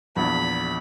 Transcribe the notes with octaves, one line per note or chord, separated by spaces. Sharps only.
A#1 E2 B5